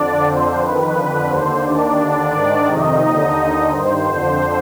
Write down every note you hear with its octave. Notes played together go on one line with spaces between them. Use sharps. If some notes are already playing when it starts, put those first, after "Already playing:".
Already playing: F2 D3 D4 D5
F2 D3 C5
F2 D#3 B4
F2 D3
D#2 D3 C5
D#2 D#3 D4 D5
D#2 D3
G#2 D#3 D4 D5
F2 C3 D#3 D#4 D#5
D#2 D3
D#2 D3
G2 D#3 C5
F2 D3 C5